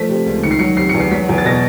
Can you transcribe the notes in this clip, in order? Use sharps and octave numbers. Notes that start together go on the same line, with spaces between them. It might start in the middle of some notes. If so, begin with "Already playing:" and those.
Already playing: F3 A3 B6
C3
C#2
D#3 C#7
C7
F#3 C#7
C3 C7
C#7
E2
C7
F#3 B6
E2
A6
B2 A#6